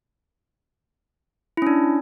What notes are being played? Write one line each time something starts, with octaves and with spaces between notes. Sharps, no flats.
C#4 D4 E4